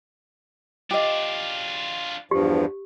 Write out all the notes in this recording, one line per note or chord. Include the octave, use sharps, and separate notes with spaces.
D4 F4 G4 D#5
E2 G2 F3 G4